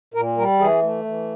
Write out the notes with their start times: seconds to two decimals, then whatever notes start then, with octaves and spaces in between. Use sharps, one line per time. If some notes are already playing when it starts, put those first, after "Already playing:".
0.14 A#2 A#4
0.37 G3 A#4
0.59 E3 G#4
0.82 A3
1.05 E3